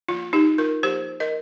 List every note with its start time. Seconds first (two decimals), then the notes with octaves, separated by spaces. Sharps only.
0.09 F3 A#3 F4
0.33 D#4 G4
0.58 F4 A#4
0.83 F3 A#3 G4 C5
1.20 A#4 D#5